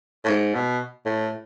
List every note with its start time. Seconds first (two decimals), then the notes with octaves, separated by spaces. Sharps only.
0.25 A2
0.29 G#2
0.55 B2
1.05 A2